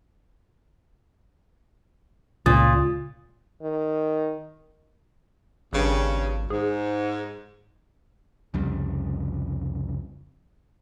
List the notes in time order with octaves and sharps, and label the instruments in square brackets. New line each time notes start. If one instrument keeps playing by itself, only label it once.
[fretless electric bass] C#2 [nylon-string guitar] A#2 [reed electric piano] F4 D#6 A6
[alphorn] D#3
[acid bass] G#1 [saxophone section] G2 C#3
[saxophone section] G#2 [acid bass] G#4
[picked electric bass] C2 F2 C#3 G3